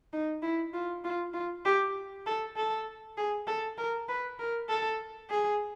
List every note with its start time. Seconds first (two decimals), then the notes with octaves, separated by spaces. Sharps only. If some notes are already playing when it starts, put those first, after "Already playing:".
0.13 D#4
0.43 E4
0.73 F4
1.04 F4
1.34 F4
1.65 G4
2.26 A4
2.57 A4
3.17 G#4
3.47 A4
3.78 A#4
4.09 B4
4.39 A#4
4.69 A4
5.30 G#4